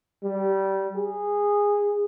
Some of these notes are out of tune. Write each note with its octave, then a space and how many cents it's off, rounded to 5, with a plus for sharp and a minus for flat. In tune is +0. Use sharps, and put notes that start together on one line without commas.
G3 -20
G#4 -15